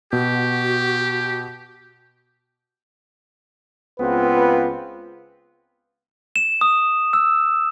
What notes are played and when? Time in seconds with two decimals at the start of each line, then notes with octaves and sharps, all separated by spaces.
0.13 B2 F#4 G4
4.00 C#2 B3 C4 F4 B4
6.36 E7
6.61 D#6
7.13 E6